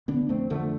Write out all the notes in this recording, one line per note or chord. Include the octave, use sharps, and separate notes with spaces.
D3 B3 D4
F2 A3 C4
D3 F3 A3